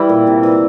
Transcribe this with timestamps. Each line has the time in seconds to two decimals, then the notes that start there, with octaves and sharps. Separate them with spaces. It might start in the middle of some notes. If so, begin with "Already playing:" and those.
Already playing: E3 G3 E4
0.09 A#2
0.27 C3
0.43 E3